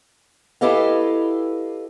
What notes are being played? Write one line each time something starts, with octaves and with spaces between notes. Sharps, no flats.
E4 G4 A4 B4 D#5 F5